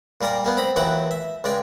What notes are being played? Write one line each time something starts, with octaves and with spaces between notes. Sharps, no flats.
A#2 G3 A#4 D5 A#5
G3 A#3 B3
C4 A#5 B5
D#2 E3 F#3 D#4 F#5 G5
E5
C#2 G#3 D5 G5